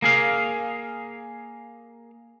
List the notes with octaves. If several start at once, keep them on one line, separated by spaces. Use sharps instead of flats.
A#3 G#4 F5